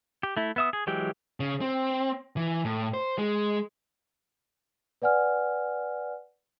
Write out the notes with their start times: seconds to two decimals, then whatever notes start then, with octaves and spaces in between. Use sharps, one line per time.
0.23 G4
0.37 A3 E4
0.56 B3 E5 D#6
0.73 G#4
0.87 E3 F#3 G#3 G4 G5
1.40 C#3
1.61 C4
2.37 E3
2.65 A2
2.94 C5
3.18 G#3
5.02 B4 D5 F#5 G#5 F6